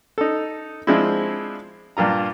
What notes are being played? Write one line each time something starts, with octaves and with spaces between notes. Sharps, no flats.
D#4 A4
F3 G#3 C4 D4 E4
G2 A#2 F4 A#5